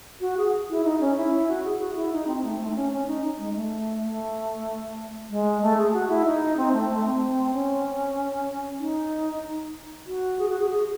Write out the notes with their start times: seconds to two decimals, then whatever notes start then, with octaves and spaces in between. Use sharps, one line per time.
0.21 F#4
0.37 G#4
0.70 E4
0.84 D#4
1.00 C#4
1.16 E4
1.48 F#4
1.64 G#4
1.80 F#4
1.95 E4
2.12 D#4
2.27 C4
2.44 A3
2.59 A3
2.71 D#4
2.76 C#4
2.92 C#4
3.07 D#4
3.39 G#3
3.54 A3
4.03 A3
5.30 G#3
5.62 A3
5.77 G#4
5.93 F#4
6.09 E4
6.25 D#4
6.57 C4
6.73 A3
6.89 A3
7.05 C4
7.52 C#4
8.80 D#4
10.07 F#4
10.39 G#4
10.49 F#4
10.60 G#4
10.70 G#4